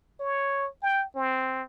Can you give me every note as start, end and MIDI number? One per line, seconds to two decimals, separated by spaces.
0.20 0.68 73
0.83 1.05 79
1.16 1.63 60